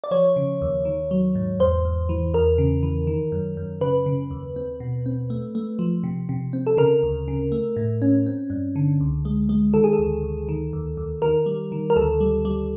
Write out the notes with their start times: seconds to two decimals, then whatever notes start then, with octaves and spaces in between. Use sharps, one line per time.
0.04 D5
0.11 F3 C#5
0.36 C#3
0.62 D#2
0.85 D#3
1.11 F#3
1.35 G#2
1.59 E2 C5
1.85 E2
2.09 E3
2.34 E2 A#4
2.58 C#3
2.83 E3
3.07 D#3
3.32 F#2
3.57 F#2
3.81 C#3 B4
4.06 C#3
4.31 D#2
4.56 C4
4.80 B2
5.06 C4
5.30 A3
5.55 A3
5.79 F3
6.03 C3
6.29 C3
6.53 C4
6.67 A4
6.77 C#3 A#4
7.03 D2
7.28 C#3
7.52 A3
7.76 A2
8.02 C#4
8.26 C4
8.50 G2
8.76 D3
9.00 C#2
9.25 G#3
9.49 G#3
9.74 D#3 A4
9.84 G#4
9.93 A4
9.98 D2
10.23 D2
10.49 D#3
10.73 D#2
10.97 D#2
11.22 D#3 A#4
11.46 G3
11.72 D#3
11.90 A#4
11.96 D2 A4
12.20 G3
12.45 G3